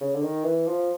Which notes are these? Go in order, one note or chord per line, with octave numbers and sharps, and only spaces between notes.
C#3
D3
D#3
E3
F3